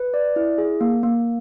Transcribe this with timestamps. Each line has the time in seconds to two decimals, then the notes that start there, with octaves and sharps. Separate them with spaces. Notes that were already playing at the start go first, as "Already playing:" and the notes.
Already playing: B4
0.14 D5
0.36 E4
0.58 G#4
0.81 A#3
1.03 A#3